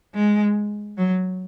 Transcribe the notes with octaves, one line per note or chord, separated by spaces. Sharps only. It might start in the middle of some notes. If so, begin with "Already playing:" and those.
G#3
F#3